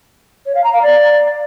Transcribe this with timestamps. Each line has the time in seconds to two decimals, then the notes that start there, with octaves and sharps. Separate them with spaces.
0.46 C#5
0.55 F5
0.64 A#5
0.73 F5
0.82 D5